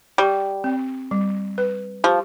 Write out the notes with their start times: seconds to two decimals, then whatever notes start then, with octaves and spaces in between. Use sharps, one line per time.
0.18 G3 G4
0.64 C4
1.11 G3
1.58 B4
2.04 F3 G4